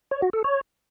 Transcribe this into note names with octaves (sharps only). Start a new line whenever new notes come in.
C#5
F#4
A4
C#5